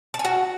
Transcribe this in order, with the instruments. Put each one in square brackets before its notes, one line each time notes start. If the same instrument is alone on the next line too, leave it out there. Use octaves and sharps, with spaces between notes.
[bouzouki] A5
G#5
F#4